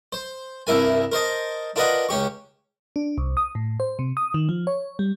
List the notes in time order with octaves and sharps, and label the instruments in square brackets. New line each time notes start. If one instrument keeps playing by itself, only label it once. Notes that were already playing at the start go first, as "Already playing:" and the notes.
[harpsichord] C5
C2 G2 E4 A#4 G#5
A#4 C5 D#5 A5
D4 F4 A#4 B4 D#5 F#5
C#2 C#4 G4 C#6
[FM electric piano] D4
C2
D#6
A2
C5
C3
D#6
D#3
F3
C#5
G3